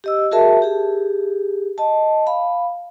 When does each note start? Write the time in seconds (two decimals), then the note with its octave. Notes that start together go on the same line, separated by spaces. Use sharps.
0.04 G4 D#5 E6
0.31 F#4 G#4 A#4 E5 A5
0.62 G4 G#4
1.78 D#5 A5
2.27 F5 B5